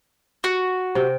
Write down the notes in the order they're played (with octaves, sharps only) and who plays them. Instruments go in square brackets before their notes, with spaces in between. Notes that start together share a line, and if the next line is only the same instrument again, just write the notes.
[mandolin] F#4
[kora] C3 G5